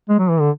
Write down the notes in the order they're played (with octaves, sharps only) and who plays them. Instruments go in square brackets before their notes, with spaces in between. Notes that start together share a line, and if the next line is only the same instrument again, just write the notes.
[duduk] G#3
F#3
E3
D3